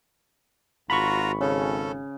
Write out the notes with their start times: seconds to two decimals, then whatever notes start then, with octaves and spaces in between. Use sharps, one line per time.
0.90 G#1 F4 F#4 A#5 B5 C#6
1.41 C#3 C#4 A4